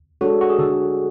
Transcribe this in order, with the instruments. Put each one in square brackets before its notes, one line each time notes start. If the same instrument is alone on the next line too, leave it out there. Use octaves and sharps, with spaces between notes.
[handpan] G#3 D4 A4 C#5 [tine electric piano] F#4
[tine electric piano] F#4
G#4
[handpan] D3 [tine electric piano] A4